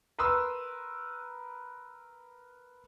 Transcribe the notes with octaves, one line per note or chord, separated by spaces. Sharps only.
A#4 B4 C6 D#6 E6